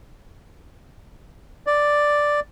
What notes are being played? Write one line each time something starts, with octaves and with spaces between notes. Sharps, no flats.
D5